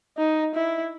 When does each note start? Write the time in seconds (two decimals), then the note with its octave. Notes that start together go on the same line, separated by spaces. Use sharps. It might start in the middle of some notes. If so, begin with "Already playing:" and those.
0.18 D#4
0.55 E4